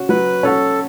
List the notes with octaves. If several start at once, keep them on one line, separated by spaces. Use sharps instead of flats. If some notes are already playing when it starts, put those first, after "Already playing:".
Already playing: C#4 F#4
F#3 B4
C#4 F#4 A4